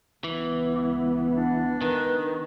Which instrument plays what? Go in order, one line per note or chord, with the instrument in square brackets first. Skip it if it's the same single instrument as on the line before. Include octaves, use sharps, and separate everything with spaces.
[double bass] C#2 B3 [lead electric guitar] E3
[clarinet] D4 [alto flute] F#5
[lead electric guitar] D#3 [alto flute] B4